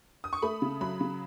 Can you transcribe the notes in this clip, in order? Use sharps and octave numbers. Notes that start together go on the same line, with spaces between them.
D#6
C#6
A3 B5
C#3
F#3 B5
C#3